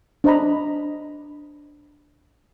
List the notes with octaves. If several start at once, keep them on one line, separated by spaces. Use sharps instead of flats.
D4 C5 D#5 A#5 B5